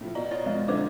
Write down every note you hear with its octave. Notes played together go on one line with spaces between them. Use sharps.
A2 F3
B2 D5 A#5
F4 C#5 D#5 A6
F2 G#3
F2 D3 E3 B4 C5 D6